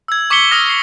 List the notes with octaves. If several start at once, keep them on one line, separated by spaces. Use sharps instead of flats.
E6 G#6
C#6 D6 B6 C#7 G7
D6 D#6 F6 A#6
C7